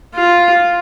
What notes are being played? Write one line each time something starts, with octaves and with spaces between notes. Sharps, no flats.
F4